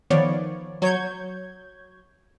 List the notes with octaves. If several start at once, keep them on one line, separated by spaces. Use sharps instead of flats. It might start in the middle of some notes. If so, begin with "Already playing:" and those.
D#3 F3 B3 C#5 D5
F#3 C#5 G6 G#6